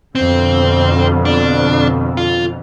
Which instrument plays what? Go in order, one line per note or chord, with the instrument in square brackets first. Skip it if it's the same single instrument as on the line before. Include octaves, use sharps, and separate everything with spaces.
[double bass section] F2 B2 D3 [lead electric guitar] C4
[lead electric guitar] D4
F4